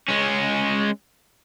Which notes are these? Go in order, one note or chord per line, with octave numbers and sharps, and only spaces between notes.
G#3 C#4